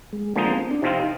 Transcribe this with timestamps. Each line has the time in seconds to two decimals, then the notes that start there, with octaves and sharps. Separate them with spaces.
0.13 G#3
0.36 D3 F3 G#3 A#3 D#4
0.48 C4
0.59 C4
0.71 D4
0.82 C3 F3 C4 D#4 F4